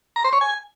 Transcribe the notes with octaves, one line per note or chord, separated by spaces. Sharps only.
A#5
C5
C#5
G#5